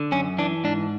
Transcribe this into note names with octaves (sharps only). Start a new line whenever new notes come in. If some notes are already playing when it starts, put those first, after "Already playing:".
Already playing: D3
F#2 C#4
E3 D4
G#2 D4